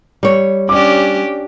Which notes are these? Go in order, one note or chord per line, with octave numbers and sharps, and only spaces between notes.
G3 C#5
C#4 D4 G4 D5 D6